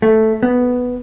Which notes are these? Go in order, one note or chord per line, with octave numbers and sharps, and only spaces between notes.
A3
B3